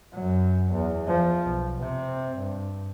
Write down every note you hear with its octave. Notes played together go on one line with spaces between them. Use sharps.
F#2 F#3
E2
F3
B1
C3 C4
G2